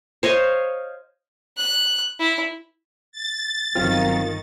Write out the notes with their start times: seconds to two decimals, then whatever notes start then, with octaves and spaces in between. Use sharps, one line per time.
0.23 C5 C#5 D#5 F5
1.57 F#6
2.19 E4
3.12 A6
3.75 G1 D#3 F#3 C4 F4 F5